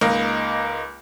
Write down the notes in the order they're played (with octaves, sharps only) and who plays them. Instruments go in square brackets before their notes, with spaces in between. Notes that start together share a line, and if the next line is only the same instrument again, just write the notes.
[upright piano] C#2 A#3 D#4 D#5 F5